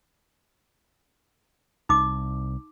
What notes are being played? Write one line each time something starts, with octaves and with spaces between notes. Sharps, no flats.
C2 D#4 D6